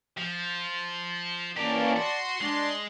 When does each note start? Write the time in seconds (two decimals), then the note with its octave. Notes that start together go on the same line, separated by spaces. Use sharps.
0.18 F3
1.57 E3 A#3 C#4 G4 A#4 D5 A5
1.96 F#4 C6
2.41 G#3 D4